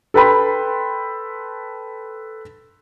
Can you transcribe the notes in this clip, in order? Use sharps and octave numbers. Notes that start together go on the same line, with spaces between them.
A4 B4 G5 B5 C6